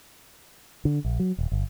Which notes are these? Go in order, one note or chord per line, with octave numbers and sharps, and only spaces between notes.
D3
A#1
F#3
D#1
G1